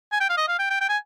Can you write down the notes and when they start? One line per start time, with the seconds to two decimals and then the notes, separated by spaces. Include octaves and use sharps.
0.12 G#5
0.20 G5
0.30 F5
0.37 D#5
0.48 F5
0.59 G5
0.70 G5
0.81 G5
0.89 G#5